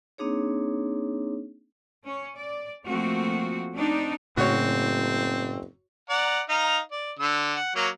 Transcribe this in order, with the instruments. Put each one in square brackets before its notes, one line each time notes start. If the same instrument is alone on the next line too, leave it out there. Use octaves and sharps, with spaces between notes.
[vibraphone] A#3 C4 D4 D#4 G#4 C#5
[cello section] C#4 C#5
D5
F3 A3 A#3 C4 F#4
C4 D4 D#4
[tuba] F#1 [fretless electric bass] A2 C#3 [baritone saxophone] C4 [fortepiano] F#4 C#5
[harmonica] D5 F#5 A#5
D#4 F5 A#5
D5
D3 E6
F#5
F#3 A#3 C#5